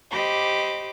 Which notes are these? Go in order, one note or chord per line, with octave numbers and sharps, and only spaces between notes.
G4 C5 D#5 B5 D6